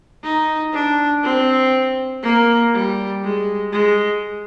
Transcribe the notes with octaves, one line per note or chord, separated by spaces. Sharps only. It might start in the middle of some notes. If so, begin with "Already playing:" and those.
D#4
D4
C4
A#3
G3
G#3
G#3